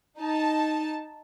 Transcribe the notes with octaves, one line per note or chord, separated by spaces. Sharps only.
D#4 A5